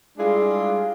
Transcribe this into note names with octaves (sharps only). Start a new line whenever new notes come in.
G3 G#3 D4 E4 F4 G#4